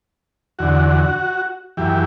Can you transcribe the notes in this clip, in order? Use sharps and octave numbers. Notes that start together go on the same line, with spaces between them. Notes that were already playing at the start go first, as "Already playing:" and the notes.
E2 D3 F#4
F#2 E3 G4